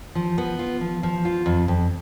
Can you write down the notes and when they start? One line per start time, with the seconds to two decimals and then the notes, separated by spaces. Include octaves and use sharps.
0.15 F3
0.38 B3
0.59 F4
0.81 F3
1.03 F3
1.25 F4
1.46 F2
1.68 F2